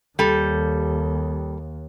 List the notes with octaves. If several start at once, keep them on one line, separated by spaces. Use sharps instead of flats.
D#2 G3 A4